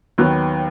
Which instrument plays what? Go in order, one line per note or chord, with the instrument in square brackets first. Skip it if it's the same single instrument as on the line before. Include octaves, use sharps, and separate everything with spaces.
[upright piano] D#2 D#3 F#3 B3